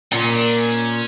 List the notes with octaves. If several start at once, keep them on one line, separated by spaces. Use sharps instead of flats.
A#2 C#4
D4
C#4